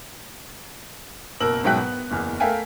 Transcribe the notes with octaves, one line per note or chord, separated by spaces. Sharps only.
F#1 B2 A#4 E6 F#7
G#2 B2 F#3 E5 G5 F#6
B3
F#1 E2 F6
A3 A#4 E5 F5 G5 G#5